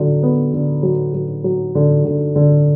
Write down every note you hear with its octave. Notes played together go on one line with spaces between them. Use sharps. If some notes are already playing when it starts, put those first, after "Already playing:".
Already playing: D3 F#3
B3
D3
F#3
F#3
F#3
D3
D3
D3